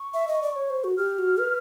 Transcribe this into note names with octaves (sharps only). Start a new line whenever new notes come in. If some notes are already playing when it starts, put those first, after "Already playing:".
Already playing: C#6
E5
D#5
D5
C#5
C5
F#4
G4 F6
F#4
B4